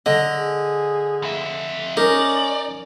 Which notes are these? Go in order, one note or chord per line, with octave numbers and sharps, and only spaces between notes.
D3 D#5
G#4
F2 E5
C#4 D#4 A#4 D5